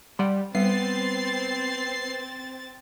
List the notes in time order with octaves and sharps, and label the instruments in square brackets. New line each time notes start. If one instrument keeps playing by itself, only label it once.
[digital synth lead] G3 [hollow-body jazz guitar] D5 F#5 C6
[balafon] G3 [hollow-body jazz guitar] B3 [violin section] C4 A6 [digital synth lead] C7